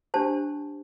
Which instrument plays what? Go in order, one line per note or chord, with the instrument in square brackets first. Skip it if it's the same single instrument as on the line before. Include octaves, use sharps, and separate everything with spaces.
[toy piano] D4 G4 C5 A5